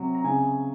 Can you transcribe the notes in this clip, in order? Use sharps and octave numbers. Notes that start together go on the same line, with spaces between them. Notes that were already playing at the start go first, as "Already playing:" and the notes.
Already playing: C3 F#3
A#5
C#3 G#5